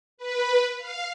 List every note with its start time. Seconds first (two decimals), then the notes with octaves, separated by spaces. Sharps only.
0.18 B4
0.78 F5